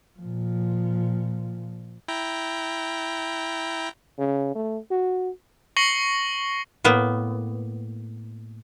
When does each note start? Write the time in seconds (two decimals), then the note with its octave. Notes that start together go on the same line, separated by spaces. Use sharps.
0.19 A#2 F3
2.08 E4 G5 A#5
4.18 C#3
4.55 A3
4.90 F#4
5.77 C#6 A#6 C7 C#7 F#7 G7
6.84 A2 A#3 B3